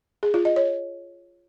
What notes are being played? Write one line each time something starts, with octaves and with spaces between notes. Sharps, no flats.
G#4
F4
D#5
C#5